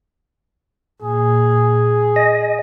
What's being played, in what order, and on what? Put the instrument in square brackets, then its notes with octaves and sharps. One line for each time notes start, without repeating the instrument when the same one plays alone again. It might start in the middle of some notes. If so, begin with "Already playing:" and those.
[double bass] A#2 [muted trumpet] G#4
[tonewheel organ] D#5